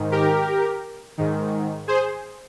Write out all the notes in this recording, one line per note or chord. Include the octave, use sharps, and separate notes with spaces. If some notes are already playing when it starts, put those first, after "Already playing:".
Already playing: G#2 D#3
G4 A#4
G#2 D#3
G#4 C5